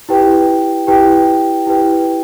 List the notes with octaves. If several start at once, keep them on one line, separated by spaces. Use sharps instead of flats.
E4 G4 B4 G5
E4 G4 B4 G5
E4 G4 B4 G5